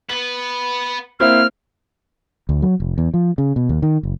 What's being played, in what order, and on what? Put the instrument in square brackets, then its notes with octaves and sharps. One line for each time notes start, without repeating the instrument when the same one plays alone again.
[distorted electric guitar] B3 B4 [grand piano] F#7
[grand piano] A#3 C4 E4 [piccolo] F6
[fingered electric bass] D2
F#3
F1
E2
F3
C#3
B2
D#2
D#3
F#1